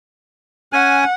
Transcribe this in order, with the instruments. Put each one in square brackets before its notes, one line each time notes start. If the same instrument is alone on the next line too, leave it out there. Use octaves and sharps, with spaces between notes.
[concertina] C#4 G#5 [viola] F#5